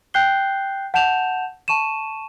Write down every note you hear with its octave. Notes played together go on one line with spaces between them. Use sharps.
G5 F#6 G6 C7 G7
F#5 A5 G6 E7 F7
A5 C#6 D#7 E7